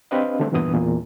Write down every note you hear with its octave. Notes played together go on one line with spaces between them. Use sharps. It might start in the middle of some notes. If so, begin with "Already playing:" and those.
C4 D4 G4 B4 D#5 F5
D3 G3 A3 C4 D4
E2 G2 A#2 E3 B3 D#6
E2 A#2